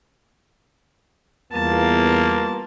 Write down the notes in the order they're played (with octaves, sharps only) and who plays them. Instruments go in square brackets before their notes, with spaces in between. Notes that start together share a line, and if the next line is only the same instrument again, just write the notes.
[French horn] E2 [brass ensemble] G3 B3 F4 [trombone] A#3 [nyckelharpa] A5